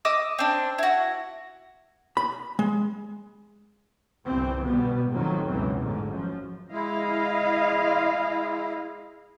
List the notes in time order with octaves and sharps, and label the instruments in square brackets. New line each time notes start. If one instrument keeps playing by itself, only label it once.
[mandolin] D#5 D6 E6
C4 D4
E4 F#4
[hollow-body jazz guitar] B5
G#3
[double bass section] G1 C2 E3 C4
B2 G3 B3
A1 F2 D#3 F#3
C#2 F#2 B2 E3 C4
A1 E2 G#2 D3
F#2 F3
[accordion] G#3 E4 [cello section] D#5 F5